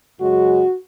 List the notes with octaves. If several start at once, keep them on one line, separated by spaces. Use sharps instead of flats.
F#2 C#3 G#3 F#4